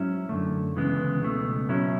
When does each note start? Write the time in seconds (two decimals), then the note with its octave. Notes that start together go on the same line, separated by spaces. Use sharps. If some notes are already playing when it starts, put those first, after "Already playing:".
Already playing: G#2 F#3 C#4 E4
0.29 F#2 D3 A3
0.76 D2 C#3 E3 G#3 B3
1.21 C#2 B2 A3
1.69 B2 F#3 C#4 E4